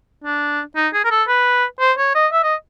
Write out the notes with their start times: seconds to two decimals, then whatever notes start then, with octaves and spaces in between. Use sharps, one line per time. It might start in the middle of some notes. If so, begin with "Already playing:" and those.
0.24 D4
0.76 D#4
0.93 G#4
1.04 A#4
1.11 A4
1.28 B4
1.80 C5
1.98 C#5
2.15 D#5
2.33 E5
2.43 D#5